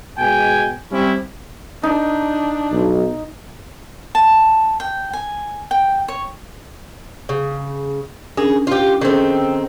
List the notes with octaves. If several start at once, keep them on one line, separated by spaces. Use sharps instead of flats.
B2 G#3 G5 G#5
G3 C4 C#4 E4 G4
D4 D#4
B1
A5
G5
G#5
G5
C#5
C#3
C#4 D4 G#4 A#4
F4 G4
D#3 C4 C#4 G#4 A4